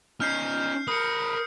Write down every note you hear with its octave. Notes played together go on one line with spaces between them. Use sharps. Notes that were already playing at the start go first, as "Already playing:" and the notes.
C#4 D#4 F6 G6 C7
A#4 B4 D#6 C#7